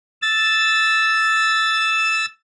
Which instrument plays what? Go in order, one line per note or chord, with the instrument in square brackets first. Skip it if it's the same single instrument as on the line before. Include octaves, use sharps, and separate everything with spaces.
[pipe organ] E6 A6